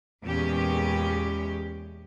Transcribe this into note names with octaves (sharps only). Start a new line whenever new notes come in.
E2 A#2 G#3 C#4 G4